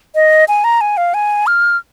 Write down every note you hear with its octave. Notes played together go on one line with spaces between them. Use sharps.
D#5
G#5
A#5
G#5
F5
G#5
F6